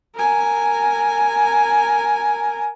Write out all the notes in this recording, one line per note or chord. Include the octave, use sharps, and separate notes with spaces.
A#4 G#5